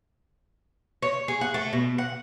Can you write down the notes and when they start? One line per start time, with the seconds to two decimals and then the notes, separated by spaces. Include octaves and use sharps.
1.02 C#5
1.28 G#4
1.41 F#5
1.54 A3
1.73 B2
1.98 F#5